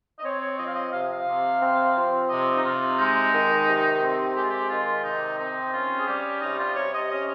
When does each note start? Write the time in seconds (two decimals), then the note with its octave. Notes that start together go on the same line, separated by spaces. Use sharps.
0.19 D#5
0.24 C4 C#5
0.41 C#5
0.58 F3 D#5
0.68 F5
0.75 D#5
0.92 C3 F5
1.12 F5
1.27 C3
1.61 C4
1.96 F3
2.29 C3 D#5
2.54 D#4
2.64 C3 F4
2.98 G#3 D#4
3.33 D#3
3.67 C3
4.01 C4
4.36 G#3 G4
4.43 F4
4.50 G4
4.70 D#3 F4
5.04 C3 D#4
5.39 C4 D#4
5.73 C#4 F4
5.98 G#4
6.07 G3 G4
6.41 C3 D#4
6.59 F4
6.76 C3 C#5
6.93 D#5
7.10 C#4 D#5